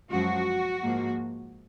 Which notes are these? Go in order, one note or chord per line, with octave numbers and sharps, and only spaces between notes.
F#2 F3 G#3 F#4
G#2 F3 A#3